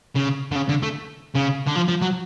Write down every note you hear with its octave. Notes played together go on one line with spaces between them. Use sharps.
C#3
D3
C#3
D3
A3
C#3
D3
F3
F3
F#3